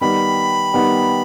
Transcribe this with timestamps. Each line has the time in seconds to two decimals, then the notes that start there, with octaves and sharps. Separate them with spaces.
0.01 D#3 G3 B3 B5
0.74 D#3 G3 B3